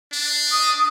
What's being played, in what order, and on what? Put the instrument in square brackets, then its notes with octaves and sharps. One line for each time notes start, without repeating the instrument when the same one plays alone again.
[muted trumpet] D4
[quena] D#6